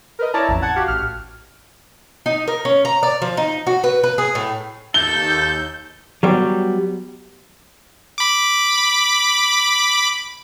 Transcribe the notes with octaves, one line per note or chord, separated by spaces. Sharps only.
A#4 B4 D#5
E4 C#5 D5 A5 A#5
A1 F2
F#5 A5 G#6
F#4 G4 F5 F#5
A1 F6
D#4
A#4
C#4
A#5
D5
F3
D#4
F#4
B4
B4
G#4
A2
D#2 A4 G6 G7
F#3 G3 B3
B5 D6